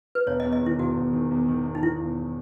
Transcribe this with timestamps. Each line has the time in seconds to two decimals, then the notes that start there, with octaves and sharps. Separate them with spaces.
0.15 B4
0.27 E1 C#5
0.40 D#5
0.44 E2
0.53 D#5
0.61 D#3
0.66 E4
0.79 E1 F#4
0.97 E1
1.13 D#3
1.31 E2
1.48 D#3
1.66 E2
1.75 D#4
1.82 D#3 E4
2.00 E1